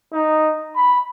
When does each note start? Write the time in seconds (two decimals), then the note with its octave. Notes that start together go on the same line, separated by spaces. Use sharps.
0.13 D#4
0.76 B5